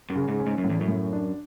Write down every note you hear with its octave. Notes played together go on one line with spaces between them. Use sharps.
F#2
C#3
G#2
C#4
G#2
F#2
A2
E2
F#2
A2
D4